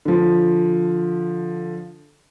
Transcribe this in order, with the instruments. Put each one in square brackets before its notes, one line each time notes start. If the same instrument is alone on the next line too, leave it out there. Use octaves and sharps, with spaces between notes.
[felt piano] D3 F3